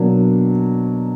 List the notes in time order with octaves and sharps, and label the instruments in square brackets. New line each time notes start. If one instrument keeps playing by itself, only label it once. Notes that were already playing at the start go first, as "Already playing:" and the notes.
Already playing: [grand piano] B2 F#3 A#3 D4